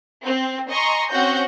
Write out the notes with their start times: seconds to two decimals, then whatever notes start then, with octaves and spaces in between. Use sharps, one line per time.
0.22 C4
0.70 D#5 G#5 A#5 C6 C#6
1.10 C4 C#4 F#4 F#5 G6 A#6